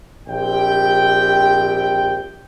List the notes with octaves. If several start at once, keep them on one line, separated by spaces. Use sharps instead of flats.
A#1 C4 G4 G5